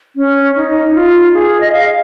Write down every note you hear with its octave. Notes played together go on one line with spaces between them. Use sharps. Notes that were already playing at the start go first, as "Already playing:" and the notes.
C#4
D#4
F4
G#4
D#5
F5